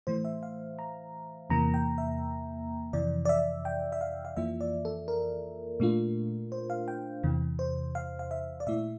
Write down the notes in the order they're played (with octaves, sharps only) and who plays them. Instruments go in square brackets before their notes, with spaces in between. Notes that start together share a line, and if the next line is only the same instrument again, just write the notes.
[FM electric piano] A2 E3 A3 C5
E5
F5
A#5
E2 C3 E3 A#3 A#5
G5
E5
F2 C3 E3 D5
D5
E5
G5
E5
F5
F5
F2 E3 A#3 F4 E5
D5
A4
A#4
A#2 A3 D4 F4
C5
F5
G5
E2 C3 E3
C5
F5
F5
E5
D5
A#2 A3 E4 E5